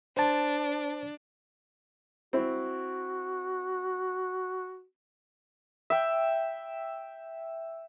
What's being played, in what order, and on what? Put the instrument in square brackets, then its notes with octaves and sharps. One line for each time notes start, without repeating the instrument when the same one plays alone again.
[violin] D4 [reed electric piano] C5 A5
[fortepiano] C4 E4 [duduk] F#4
[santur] E5 G5